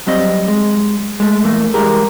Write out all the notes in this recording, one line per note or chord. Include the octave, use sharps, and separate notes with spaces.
F#3 G3 C4 D#5
G#3
G#3 A3
A#2 E3 A3 A#3
E3 G3 G#3 G4 G#4 A#4